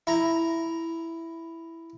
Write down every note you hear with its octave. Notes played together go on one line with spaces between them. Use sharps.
E4 A#5